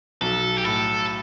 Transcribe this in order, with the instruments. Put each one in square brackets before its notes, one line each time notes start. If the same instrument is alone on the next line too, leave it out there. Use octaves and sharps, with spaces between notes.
[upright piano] B1 [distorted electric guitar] A4
[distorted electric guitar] G4
[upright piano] A2 [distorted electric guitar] A4